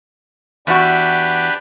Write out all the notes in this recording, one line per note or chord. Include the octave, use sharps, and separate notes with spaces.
E2 D4 F#4 G4 B4